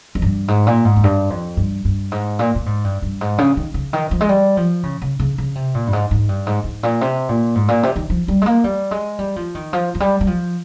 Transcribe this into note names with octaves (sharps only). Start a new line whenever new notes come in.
F2
G2
G#2
A#2
G#2
F2
G2
F2
G2
G2
G#2
A#2
A#2
G#2
G2
G2
G#2
C#3
D#3
C#3
D#3
F3
G#3
G3
F3
C#3
C#3
C#3
C#3
C3
A#2
G2
G#2
G#2
G2
G#2
G#2
A#2
C3
A#2
G#2
A#2
C3
D#3
F3
G3
G#3
A#3
G3
G#3
G3
F3
D#3
F3
F3
G3
G3
F3